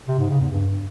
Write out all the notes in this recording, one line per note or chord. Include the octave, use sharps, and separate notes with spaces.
C3
G#2
C#3
E2
G2